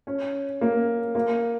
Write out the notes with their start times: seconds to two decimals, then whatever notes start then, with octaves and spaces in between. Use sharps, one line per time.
0.07 C#4
0.61 A#3
1.15 A#3